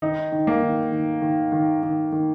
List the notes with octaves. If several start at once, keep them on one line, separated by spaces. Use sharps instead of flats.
D#3 D#4
D#3
A#3
D#3
D#3
D#3
D#3
D#3
D#3